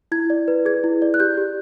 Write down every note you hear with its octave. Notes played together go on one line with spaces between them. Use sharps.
E4 G#6
D5
B4
G#4 G#6
E4
D5
F#6
G4 G6
G4